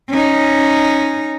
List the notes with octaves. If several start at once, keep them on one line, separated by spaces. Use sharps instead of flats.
C#4 D#4